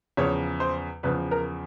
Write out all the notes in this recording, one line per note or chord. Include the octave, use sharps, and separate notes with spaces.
E2 C#3 F3 C#5
C5
E2 C#3 F3 B4
A#4